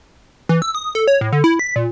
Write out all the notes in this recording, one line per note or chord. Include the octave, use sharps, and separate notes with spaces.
E3
E6
D#6
A4
C#5
A2
D3
E4
B6
A#2